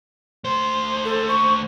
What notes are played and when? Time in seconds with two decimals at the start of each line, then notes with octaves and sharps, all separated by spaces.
0.44 D2 C5
1.05 A4
1.29 C#6